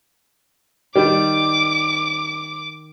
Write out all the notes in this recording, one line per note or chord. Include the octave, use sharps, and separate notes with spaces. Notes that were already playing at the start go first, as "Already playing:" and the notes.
D#3 G3 D5 D6